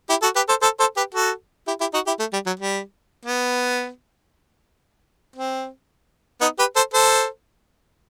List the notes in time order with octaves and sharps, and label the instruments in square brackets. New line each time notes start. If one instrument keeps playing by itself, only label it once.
[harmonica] E4 G4
F#4 A4
G4 B4
A4 C5
A4 C5
A4 C5
G4 B4
F#4 A4
E4 G4
E4 G4
D#4 F#4
E4 G4
A3
G3
F#3
G3
B3
C4
B3 D#4
G4 B4
A4 C5
A4 C5